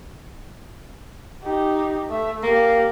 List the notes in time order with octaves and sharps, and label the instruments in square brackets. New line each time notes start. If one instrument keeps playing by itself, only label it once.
[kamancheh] D#4 G4
A3 E5
[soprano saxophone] A#3 [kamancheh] G4 F5